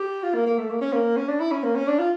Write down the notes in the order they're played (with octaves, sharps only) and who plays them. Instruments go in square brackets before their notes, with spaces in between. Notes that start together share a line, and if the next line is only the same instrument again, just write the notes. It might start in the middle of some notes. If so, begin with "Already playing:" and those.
Already playing: [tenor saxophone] G4
F4
A#3
A#3
A3
A#3
C#4
A#3
C#4
D4
E4
C#4
A#3
C#4
D4
F4